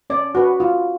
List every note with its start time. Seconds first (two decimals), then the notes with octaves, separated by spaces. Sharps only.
0.10 C#4 D5
0.35 F#4 B4
0.60 F4